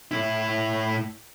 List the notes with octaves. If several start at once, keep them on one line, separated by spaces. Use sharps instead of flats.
A2 E4